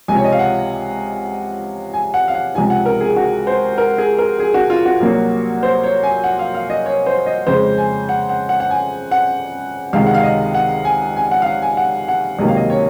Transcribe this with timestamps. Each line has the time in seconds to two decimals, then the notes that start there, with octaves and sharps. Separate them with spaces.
0.08 C#2 C3 F3 G#5
0.16 C#5
0.24 D#5
0.32 F5
0.39 F#5
1.94 G#5
2.14 F#5
2.28 F5
2.35 F#5
2.55 C#2 C3 F3 G#5
2.70 F#5
2.86 A#4
3.00 G#4
3.16 F#4
3.47 C5
3.78 A#4
3.98 G#4
4.18 A#4
4.40 G#4
4.54 F#4
4.70 F4
4.85 F#4
5.00 C2 A#2 F#3 A#3
5.63 C5
5.83 C#5
6.03 G#5
6.24 F#5
6.39 F5
6.55 F5
6.70 D#5
6.86 C#5
7.06 C5
7.26 D#5
7.47 F2 C#3 G#3 C5
7.78 G#5
8.09 F#5
8.29 F#5
8.49 F#5
8.60 F#5
8.70 G#5
9.11 F#5
9.93 C#2 C3 D#3 G#3 F5
10.07 F#5
10.14 F5
10.23 D#5
10.54 F#5
10.85 G#5
11.16 G#5
11.31 F#5
11.42 F5
11.46 F#5
11.62 G#5
11.77 F#5
12.08 F#5
12.39 C#2 C3 D#3 F#3 A#3 D#5
12.48 F5
12.57 D#5
12.70 C#5